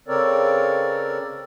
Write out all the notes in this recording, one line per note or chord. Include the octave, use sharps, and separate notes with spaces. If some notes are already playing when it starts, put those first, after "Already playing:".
C#3 C4 A4 A#4 C#5 D5